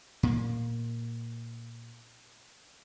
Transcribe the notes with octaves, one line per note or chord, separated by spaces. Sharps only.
A#2 A#3